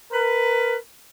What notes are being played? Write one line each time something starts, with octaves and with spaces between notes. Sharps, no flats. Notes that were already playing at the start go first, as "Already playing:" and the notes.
A#4 B4